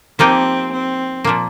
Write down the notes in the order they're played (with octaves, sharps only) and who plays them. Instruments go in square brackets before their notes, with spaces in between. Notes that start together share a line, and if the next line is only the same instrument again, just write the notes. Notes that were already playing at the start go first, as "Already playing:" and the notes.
[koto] F3 A#3 D#4 G4 [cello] C4
[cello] C4
[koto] A#2 F3 A#3